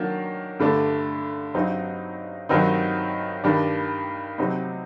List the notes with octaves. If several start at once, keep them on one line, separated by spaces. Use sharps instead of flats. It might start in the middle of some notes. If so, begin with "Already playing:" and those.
Already playing: D#3 F#3 A#3 D4
G2 D3 A3 D4
G2 F#3 C4 D#4
G2 D#3 F#3 C4 D#4
G2 D#3 G3 D4
C3 F#3 C4 D#4